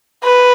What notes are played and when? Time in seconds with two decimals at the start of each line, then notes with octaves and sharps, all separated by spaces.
0.24 B4